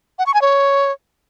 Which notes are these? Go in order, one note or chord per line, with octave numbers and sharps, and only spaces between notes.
F#5
C#6
G#5
C#5